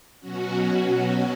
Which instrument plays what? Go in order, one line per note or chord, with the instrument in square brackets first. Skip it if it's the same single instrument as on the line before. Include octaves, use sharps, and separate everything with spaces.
[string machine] B2 F#3 C#4 F#4